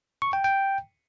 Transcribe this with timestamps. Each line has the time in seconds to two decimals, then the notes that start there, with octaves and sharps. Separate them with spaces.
0.22 C#6
0.33 G5
0.44 G5